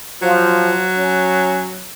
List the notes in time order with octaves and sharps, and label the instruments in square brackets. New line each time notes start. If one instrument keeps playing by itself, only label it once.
[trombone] F3 [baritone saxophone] F#3
[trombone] C#4